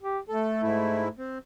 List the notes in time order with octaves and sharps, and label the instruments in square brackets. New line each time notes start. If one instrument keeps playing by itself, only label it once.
[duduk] G4
[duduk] A3 [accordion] A4
[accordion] G#2 E4
C4